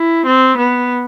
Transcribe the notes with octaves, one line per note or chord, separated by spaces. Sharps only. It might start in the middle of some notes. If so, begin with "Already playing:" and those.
Already playing: E4
C4
B3